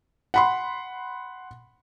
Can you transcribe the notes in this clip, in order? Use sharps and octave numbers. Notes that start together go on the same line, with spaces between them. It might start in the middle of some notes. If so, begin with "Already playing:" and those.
F#5 B5 C6